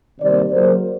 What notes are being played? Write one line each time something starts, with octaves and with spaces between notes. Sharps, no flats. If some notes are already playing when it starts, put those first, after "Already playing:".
C3 D#3 G3 A#3 C5 D5
F#2 C#3 F#3 A#3 A#4 C5